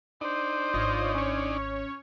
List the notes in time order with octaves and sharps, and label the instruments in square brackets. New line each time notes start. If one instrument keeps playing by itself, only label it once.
[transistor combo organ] D4 D#4 D5 [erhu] C5
[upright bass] G#1 [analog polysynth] F4 C#5 D#5
[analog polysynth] C#4 C#5